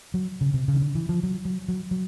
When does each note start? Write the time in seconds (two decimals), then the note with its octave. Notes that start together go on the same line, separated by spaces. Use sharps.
0.14 F#3
0.41 C#3
0.54 C3
0.68 C#3
0.75 D#3
0.81 D3
0.95 E3
1.09 F3
1.23 F#3
1.45 F#3
1.68 F#3
1.91 F#3